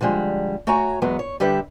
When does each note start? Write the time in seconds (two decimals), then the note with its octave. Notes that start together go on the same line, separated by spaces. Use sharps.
0.01 D3 F3 G3 G#3
0.67 A3 F#4 C#5 G#5 A#5
1.02 E2 F#3 G#3 B3
1.19 C#5
1.40 D3 G3 G4 B4 E5